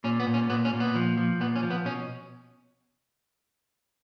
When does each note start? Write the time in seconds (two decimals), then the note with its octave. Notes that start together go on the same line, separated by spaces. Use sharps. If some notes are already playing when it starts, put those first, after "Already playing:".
0.04 A#2 C#4
0.20 B3
0.27 A#2
0.34 C#4
0.50 A#2 B3
0.65 C#4
0.73 A#2
0.80 B3
0.95 F3
1.18 F3
1.40 A#2 B3
1.56 C#4
1.63 F3
1.70 B3
1.85 B2 C#4